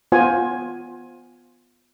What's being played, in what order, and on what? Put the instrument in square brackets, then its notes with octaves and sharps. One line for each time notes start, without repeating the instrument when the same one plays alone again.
[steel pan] B3 F4 C5 G#5